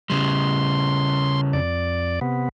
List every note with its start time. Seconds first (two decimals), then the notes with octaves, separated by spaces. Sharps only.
0.10 C#3 G3 C6
1.53 F2 D5
2.21 C3 B3